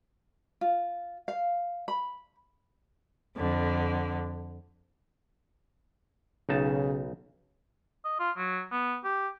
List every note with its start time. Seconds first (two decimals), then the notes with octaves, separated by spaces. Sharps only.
0.61 F4
1.28 F5
1.88 B5
3.36 F2 D3
6.49 B1 C#3 D#4 A5
8.05 D#5
8.20 F4
8.37 F#3
8.72 B3
9.04 G4